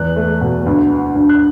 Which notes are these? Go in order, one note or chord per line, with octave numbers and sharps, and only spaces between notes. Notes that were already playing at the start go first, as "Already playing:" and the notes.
Already playing: E2 F#6
A3
B2
D2
D3
D2
F#6